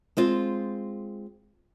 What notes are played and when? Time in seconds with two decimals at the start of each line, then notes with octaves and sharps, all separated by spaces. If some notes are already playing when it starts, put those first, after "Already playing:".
0.17 G#3 C4 F4